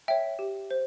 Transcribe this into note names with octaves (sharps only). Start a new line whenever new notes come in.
C#5 E5 G5
G4
C5